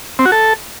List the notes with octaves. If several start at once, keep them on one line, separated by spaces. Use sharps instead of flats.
C4
F#4
A4